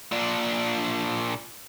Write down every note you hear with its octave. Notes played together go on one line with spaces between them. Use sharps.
A#2 D4